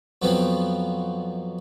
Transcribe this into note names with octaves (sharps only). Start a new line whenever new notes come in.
F2 B2 F3 F#3 B3 C4